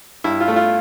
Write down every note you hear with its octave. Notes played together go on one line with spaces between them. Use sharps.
G2 E4
F4
A3
F4